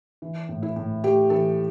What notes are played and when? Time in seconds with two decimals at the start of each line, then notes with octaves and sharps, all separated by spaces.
0.22 E3
0.49 A2
0.63 E4
0.76 A2
1.04 A3 G4
1.30 E3 A4